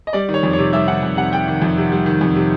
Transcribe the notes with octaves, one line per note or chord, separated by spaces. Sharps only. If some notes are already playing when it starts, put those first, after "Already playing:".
D#5
G3 D5
D#3
C#5
F2
C#5
C3
G3 E5
D#3 F#5
F2
C3 F#5
G3 G5
D#3
F2
C3
G3
D#3
F2
C3